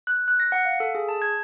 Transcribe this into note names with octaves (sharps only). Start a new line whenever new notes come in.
F#6
F#6
A#6
F#5
F5
A4
G#4
A5
G#6